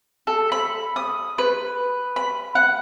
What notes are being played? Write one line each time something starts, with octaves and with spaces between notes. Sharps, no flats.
A4
B5
D#6
B4
B5
F#5